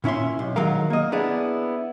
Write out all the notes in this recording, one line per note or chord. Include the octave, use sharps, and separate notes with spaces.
A#2 C#4 E4 E5 C6
B1
D#3 F#3 G#3 A#4 F5
A#3 D#5
B3 D4 E4 G#4